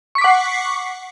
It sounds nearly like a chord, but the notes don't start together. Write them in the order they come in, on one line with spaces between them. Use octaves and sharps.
C#6 B6 D6 F#5 C7